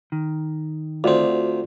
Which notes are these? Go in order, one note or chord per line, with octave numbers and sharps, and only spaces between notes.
D#3
D2 C4 F4 F#4 D5